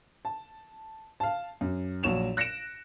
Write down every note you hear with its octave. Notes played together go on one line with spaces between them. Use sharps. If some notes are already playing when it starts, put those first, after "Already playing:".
A5
F5 A5
F#2
A#1 F#3 C#5 E7 F7
F#6 A#6 C#7 D7 E7